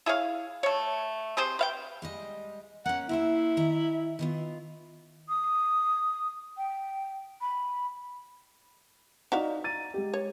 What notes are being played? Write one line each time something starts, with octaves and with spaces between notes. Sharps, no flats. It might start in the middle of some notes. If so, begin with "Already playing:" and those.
E4 G#4 C#5 F5
A3 C#5
C4 G4 G#4 C5
B4 F5 G5
G3 G#3 D#5
A#3 C#4 F#5
A#3 E4 C5 E5
D#3 E5 A#5
D#3 B3 F4
D#6
G5
B5
D#4 F#4 D5 E5 F5
A#5 A6 D#7
G#3 G4
C#5